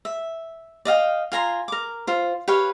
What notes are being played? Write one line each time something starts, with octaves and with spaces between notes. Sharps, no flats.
E5
D5 D#5 F5 G5
F4 G#5 A#5 C6
A#4 D6
F4 C5
G4 B4 C#5 F5